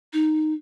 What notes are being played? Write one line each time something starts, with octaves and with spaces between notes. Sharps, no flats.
D#4